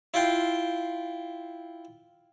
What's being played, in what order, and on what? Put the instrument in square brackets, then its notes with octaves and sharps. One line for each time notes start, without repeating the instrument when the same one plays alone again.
[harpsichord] E4 F4 G5 C6